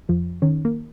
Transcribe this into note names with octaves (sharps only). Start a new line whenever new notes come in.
F2 F3
D#3 C#4
A#3